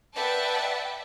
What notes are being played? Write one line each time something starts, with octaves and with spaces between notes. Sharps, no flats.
B4 D5 E5 F#5 G5 A5